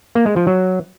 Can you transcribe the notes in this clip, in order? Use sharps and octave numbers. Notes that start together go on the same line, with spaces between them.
A#3
G#3
F3
F#3